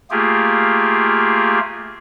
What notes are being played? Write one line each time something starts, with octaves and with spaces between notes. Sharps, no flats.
A3 A#3 F4 G4 G#4